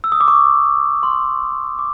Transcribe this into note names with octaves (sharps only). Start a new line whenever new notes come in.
E6
D#6
D6
C#6
C6
D6